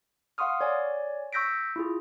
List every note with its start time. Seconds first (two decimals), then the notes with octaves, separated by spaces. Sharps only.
0.38 F5 F#5 C6 C#6 D#6 F6
0.61 C#5 D5 G#5
1.33 C#6 E6 G6 A#6 B6 D7
1.76 E4 F4 G#4